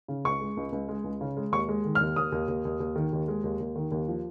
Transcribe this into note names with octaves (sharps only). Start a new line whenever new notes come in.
C#3
C#2 C#6
G#3
C#2
C#2
G#3
C#2
C#3
G#3
D#2 C#6
G#3
D#3
F6
D#2
D#2 D#6
D#2
D#2
D#2
D#2
D#3
D#2
G#3
D#2
D#2
D#3
D#2
F3